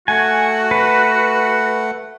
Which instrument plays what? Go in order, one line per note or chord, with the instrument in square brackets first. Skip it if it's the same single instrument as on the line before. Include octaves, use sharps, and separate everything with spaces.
[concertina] A3 F#5 [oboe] F#4 [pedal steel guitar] G#5
[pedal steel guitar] B4